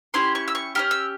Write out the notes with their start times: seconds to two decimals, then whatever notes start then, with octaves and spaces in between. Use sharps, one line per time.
0.14 C#4 E4 G4 C6
0.35 C#6
0.48 E6
0.55 C#6
0.75 C#4 E4 G4 F6
0.91 E6